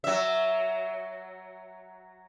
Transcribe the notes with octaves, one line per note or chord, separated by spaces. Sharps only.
F#3 E5